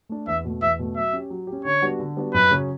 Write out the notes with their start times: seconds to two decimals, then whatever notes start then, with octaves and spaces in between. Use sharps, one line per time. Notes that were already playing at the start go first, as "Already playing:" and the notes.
0.09 A3 D4
0.27 E2 E5
0.45 B2 A3
0.62 E2 E5
0.79 B2 A3
0.96 F#3 E5
1.13 C#4 G4
1.30 F#3
1.47 G4
1.52 C#4
1.65 D3 C#5
1.82 G3 B3 D4 F#4
1.99 D3
2.17 G3 B3 D4 F#4
2.34 F#2 B4
2.51 C#3 F#3 C#4